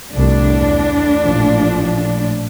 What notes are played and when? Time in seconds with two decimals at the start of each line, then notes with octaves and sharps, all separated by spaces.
0.14 C2 F2 A2 D4
0.56 E2
1.23 A1 A#2 F3